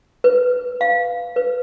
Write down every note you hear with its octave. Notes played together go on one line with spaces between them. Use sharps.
B4
F5
B4